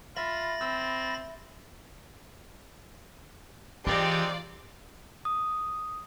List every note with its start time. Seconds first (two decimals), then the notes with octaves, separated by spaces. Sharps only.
0.16 F4 E5 B5 A6 A#6
0.61 C4 E6
3.87 E3 G#3 C4 D#4 F4 G4 D5
5.25 D#6